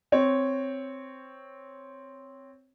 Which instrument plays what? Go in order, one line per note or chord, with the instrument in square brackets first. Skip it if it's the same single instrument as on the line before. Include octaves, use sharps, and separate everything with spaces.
[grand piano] C4 C#5